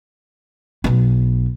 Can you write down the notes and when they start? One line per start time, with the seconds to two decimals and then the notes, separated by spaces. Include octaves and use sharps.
0.84 B1 B3